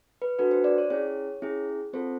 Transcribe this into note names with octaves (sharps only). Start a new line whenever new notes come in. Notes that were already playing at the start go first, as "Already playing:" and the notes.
B4
D4 F#4 A4 B4
C5
D5
C#5
C#4 E4 G#4 C#5
C#4 E4 G#4
C4 F4 A4 C5